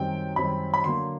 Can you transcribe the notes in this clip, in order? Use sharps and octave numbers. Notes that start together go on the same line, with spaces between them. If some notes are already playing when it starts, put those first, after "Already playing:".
Already playing: F#2 D#3 G3 C4 G5
F#2 D#3 G3 C4 B5
B5
D3 F#3 A#3 C6